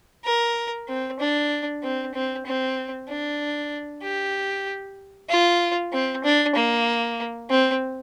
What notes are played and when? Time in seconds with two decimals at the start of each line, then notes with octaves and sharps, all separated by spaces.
0.25 A#4
0.88 C4
1.20 D4
1.83 C4
2.14 C4
2.45 C4
3.08 D4
4.03 G4
5.29 F4
5.93 C4
6.24 D4
6.55 A#3
7.50 C4